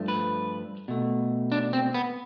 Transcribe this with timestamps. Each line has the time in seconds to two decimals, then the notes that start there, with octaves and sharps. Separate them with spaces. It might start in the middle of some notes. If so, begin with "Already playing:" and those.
Already playing: G2 F3 A3
0.08 B4
0.88 B2 A3
1.52 D4
1.73 C4
1.94 B3